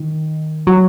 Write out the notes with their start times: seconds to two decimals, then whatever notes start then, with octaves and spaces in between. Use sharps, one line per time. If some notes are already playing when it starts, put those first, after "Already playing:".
Already playing: D#3
0.67 F#3